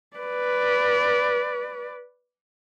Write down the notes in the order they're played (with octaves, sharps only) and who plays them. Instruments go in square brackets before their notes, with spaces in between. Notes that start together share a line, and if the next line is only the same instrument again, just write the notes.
[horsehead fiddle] B4 D5